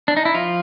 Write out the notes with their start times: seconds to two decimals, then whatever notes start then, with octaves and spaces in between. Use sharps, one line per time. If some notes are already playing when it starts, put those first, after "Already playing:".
0.08 D4
0.17 D#4
0.25 E4
0.34 F3 F4